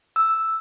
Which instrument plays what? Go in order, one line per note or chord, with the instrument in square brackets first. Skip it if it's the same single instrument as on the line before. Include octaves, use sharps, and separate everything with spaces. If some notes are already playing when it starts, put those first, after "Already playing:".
[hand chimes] E6